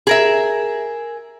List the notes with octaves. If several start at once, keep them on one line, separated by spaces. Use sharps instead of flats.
G#4 A#4 E5